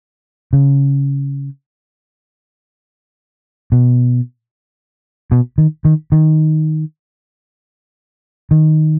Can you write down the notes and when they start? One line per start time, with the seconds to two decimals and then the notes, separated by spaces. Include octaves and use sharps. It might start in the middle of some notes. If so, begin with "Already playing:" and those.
0.53 C#3
3.72 B2
5.32 B2
5.58 D#3
5.85 D#3
6.12 D#3
8.51 D#3